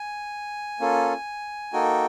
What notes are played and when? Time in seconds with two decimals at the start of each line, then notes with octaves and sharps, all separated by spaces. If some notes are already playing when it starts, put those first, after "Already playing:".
Already playing: G#5
0.80 A#3 C#4 F4 A4
1.73 A#3 D#4 F#4 A4 G5